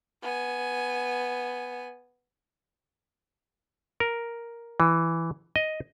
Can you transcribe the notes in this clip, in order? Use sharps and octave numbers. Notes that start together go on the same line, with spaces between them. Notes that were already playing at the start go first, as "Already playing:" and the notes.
B3 G#5
A#4
E3
D#5